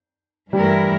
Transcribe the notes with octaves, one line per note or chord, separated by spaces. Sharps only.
G2 E3 G3 A3 E4 A#4